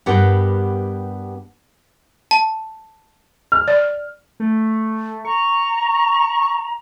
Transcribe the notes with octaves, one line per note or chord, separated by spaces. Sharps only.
G2 B3 G4 A#4 B4 F#5
A5
F6
D5
A3
A#5 C#6